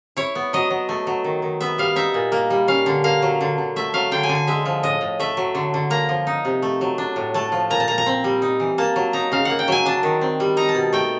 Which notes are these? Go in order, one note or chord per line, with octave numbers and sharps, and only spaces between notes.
E4 C#5
B3
F#3 D#5
F#3
A3
F#3
D#3
D#3
B3 E5
G3 F5
D#4 E5
A#2
A#3
G3
C#4 F5
D3
A#3 F5
F#3
D3
D3
A3 E5
F#3 F5
D3 G5
G#5
D3
G#5
G#3 E5
F3
A2 D#5
A2
A3 E5
F#3
D3
D3
A#3 A#5
F3
D#4
C3
A3
F#3
D4
A2
A3 A5
F3
A#2 A#5
A5
A#2 A#5
A#5
C4
G3
D#4
E3
A#3 A5
F#3
D#4 A#5
C#3 F5
A#3 F#5
G5
F#3 G#5
D4 A5
D#3
C4
G3
D#4 A#5
A5
B2
A3 G5